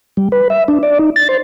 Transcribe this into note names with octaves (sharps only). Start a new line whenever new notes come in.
G3
B4
E5
D4
D5
D#4
A6
C5